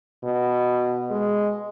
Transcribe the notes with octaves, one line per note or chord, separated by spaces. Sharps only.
B2
G#3